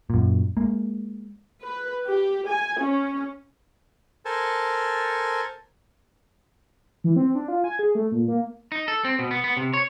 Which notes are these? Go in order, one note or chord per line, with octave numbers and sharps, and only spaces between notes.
F#2 A#2
G#3 A#3
B4
G4
G#5
C#4
A4 A#4 C5 G#5 A5
E3
C4
D4
F4
G#5
G#4
A3
A#2
A#3
D#4
A4
C4
B2
B3
B3
C3
C#5